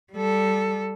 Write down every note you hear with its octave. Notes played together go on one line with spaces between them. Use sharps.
G3 A4